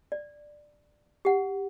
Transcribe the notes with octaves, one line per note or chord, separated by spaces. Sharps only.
D5
G4 F#5